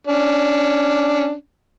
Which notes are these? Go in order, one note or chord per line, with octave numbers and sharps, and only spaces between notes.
C#4 D4